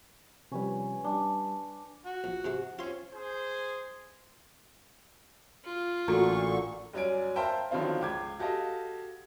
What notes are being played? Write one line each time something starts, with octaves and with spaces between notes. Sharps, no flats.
C3 F3 G3 C#4 B4
G3 D4
F#4 F#5
A#1
G#2 C3 G#3
C4 C#4 F4 C6
G#4 C5
F4
A1 A#2 D3 F#4 A4 A#5 C#6
G1 F#3 C#4 D5 G#5 D7
A#4 C5 E5 F5 G5 A5
D3 D#3 F3 F#3 C4 F4
C#2 D6 G#6
F#4 G4 A4 D#5 F5